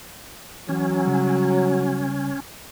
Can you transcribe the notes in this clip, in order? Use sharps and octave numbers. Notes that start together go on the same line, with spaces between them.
E3 F#3 C#4
C#3 G3